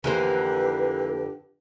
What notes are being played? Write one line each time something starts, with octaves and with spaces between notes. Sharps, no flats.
F2 D3 E3 A#3 G4 B4 C5